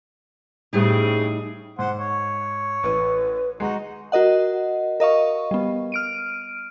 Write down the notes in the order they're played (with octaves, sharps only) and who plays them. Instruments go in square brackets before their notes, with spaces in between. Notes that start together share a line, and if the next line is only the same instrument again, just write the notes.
[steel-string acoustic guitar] A2 G3 D#4 [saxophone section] C#3 C4 G#4
[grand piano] G#2 [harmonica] C5 F#5
[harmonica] C#5
[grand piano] A1 [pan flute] B4
[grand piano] G#3 [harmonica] D#4 F#4
[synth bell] F#4 A#4 D#5 F#5
A#4 D#5 F5 C#6
G3 B3
F6 D7 D#7